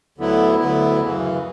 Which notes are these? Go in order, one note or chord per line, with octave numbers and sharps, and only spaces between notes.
D2 D3 F#3 B3 E4
D2 D3 F#3 B3 E4
F#2 C#3 E3